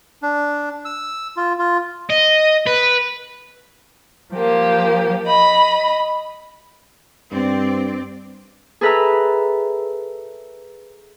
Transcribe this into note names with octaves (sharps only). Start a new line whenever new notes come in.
D4
E6
F4
F4
D#5
B4
F3 A#3 G4
D#5 B5
G2 C4 D5
G#4 A4 B4 E5 A#5 E6